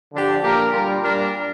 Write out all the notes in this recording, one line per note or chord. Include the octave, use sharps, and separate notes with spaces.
D3 F3 D4 G4
A#2 A#3 G4 A#4
G3 D4 F4 A#4
A#2 G3 D4 A#4